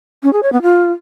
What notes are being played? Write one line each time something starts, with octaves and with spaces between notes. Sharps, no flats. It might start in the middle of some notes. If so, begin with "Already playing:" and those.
C#4
G#4
C#5
B3
F4